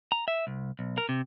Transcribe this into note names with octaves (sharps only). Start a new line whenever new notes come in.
A#5
E5
C2
B1
A#4
C3